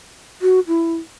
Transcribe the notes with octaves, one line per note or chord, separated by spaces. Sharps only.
F#4
E4